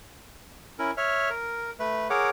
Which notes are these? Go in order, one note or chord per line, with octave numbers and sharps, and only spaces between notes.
C#4 E4 A#4
C#5 E5 F6
A#4
A3 B4
G#4 A#4 C#5 F#5 D6